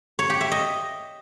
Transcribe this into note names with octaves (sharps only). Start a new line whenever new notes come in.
C#5
G4
E5
D#5